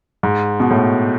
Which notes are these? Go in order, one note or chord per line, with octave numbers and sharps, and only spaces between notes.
G#2
B2
A2